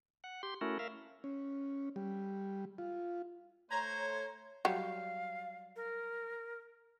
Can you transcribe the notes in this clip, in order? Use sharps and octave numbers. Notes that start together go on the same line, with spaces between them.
F#5
G4 C6
A3 C#4 E4 F#4 A#4
A#4 E5 F5
C#4
G3
F4
A3 C5 C#5 A#5 G#6
F#3 G3 F5
A#4